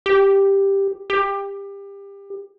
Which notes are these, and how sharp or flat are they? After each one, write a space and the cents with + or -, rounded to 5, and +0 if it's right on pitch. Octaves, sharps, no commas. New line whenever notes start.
G4 +5
G4 +25